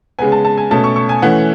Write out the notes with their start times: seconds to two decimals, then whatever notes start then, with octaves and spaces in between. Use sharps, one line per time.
0.19 C#3 G#3 B3 G#5
0.32 A5
0.45 A5
0.58 G#5
0.71 B2 A3 C#4 A5
0.84 C#6
0.96 C#6
1.09 G#5
1.22 E3 A3 C#4 F#5